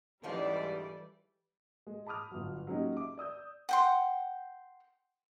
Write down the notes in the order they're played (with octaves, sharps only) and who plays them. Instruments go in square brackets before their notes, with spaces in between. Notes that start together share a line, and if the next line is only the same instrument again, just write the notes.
[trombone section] C#2 G#2 [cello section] E3 D5 [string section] G3 [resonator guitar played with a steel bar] A3 C5 F5
[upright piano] G#3
A5 B5 D6 D#6 F6
G1 F#3
F#3 G#3 A#3 C#4 D#4 G4
E5 D6
D5 D#6 E6 G6
[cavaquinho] F#5 G5 C6